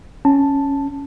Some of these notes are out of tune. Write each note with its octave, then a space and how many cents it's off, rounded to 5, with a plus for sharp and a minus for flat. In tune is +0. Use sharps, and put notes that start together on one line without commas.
C#4 +0 A5 +0